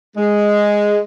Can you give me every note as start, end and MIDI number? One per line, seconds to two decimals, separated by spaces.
0.17 1.00 56